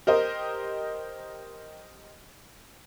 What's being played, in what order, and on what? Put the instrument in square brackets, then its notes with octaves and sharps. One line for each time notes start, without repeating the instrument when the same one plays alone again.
[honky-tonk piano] G4 A#4 C5 D#5